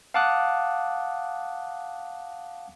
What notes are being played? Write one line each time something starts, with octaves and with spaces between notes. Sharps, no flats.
F5 F#5 A5 D6 D#6 F#6